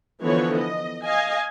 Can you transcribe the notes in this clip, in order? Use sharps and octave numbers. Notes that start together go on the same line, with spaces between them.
D3 E3 F3 B3 C#5
D#5
D#5 F5 G#5